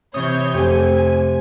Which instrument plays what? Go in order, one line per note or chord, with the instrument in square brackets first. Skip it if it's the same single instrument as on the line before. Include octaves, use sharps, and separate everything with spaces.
[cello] C3 E3 [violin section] C#5 G6 [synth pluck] D#6
[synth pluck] F2 [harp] C3 G4 [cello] A3 [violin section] G#5